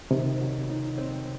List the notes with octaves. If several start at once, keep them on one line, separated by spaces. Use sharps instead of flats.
C3 D#3
F#3
D#4
C4